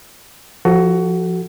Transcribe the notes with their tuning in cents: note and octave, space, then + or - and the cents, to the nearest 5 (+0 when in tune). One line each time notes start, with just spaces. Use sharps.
F3 +0 F#4 +20 A4 +0